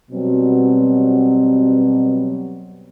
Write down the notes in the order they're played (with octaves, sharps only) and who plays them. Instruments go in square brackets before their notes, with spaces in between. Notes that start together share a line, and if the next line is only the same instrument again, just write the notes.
[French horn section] B2 F#3 G3 C4